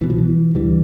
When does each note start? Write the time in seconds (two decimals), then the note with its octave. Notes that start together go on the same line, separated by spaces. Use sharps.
0.01 C2 B2 E3
0.10 F3
0.18 E3
0.55 D2 D3 E3 G3